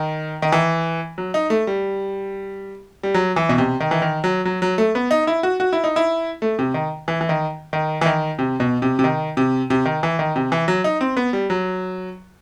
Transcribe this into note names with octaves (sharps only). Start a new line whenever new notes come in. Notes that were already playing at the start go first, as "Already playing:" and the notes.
Already playing: D#3
D#3
E3
F#3
D#4
A3
G3
G3
F#3
E3
B2
C3
D#3
E3
D#3
F#3
F#3
F#3
A3
B3
D#4
E4
F#4
F#4
E4
D#4
E4
A3
C3
D#3
E3
E3
D#3
D#3
E3
D#3
C3
B2
C3
C3
D#3
C3
C3
D#3
E3
D#3
C3
E3
F#3
D#4
C4
B3
G3
F#3